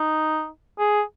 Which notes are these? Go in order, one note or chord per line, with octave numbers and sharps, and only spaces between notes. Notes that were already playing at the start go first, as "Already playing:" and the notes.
Already playing: D#4
G#4